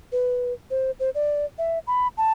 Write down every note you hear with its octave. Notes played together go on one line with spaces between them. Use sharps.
B4
C5
C5
D5
E5
B5
A5